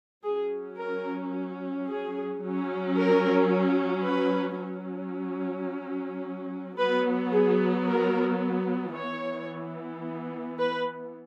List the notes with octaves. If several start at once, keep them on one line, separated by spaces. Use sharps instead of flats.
F#3 C#4 G#4
A#4
G#4
F#3 C#4
A#4
B4
F#3 C#4
F#3 B3 B4
G#4
A#4
E3 B3 C#5
B4